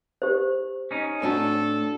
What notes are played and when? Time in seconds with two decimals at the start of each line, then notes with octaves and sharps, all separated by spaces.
0.22 G4 C5
0.91 C#4 D#4
1.22 A2 C4 D4 F#4 A4